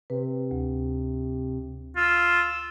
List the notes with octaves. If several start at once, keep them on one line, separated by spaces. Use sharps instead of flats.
C3 B4
D2
F4 E6